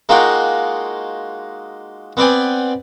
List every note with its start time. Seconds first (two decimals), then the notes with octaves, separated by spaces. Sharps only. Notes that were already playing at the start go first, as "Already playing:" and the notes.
0.09 G#3 A#3 D#4 F4 F#4 G5
2.17 B3 C4 B4 D5 G5 G#5